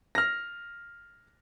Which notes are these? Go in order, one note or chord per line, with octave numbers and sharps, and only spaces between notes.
F6 A#6